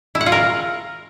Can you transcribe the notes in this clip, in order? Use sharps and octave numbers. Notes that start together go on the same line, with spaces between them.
E4
F#5
F4
A#4